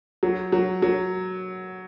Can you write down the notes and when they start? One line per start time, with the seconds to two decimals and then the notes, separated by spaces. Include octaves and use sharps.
0.23 F#3
0.52 F#3
0.82 F#3